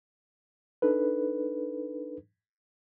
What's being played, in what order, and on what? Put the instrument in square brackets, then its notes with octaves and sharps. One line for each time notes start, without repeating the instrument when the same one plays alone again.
[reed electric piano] D4 D#4 A4 B4